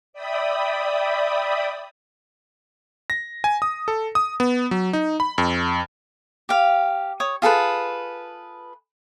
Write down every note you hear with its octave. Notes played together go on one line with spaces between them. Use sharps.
D5 E5 G5 B5 D#6
A#6
G#5
D#6
A4
D#6
B3
F#3
D#4
B5
F2
G4 F5
C#5 D#6
F4 G#4 A4 B4